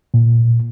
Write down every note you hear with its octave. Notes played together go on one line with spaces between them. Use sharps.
A#2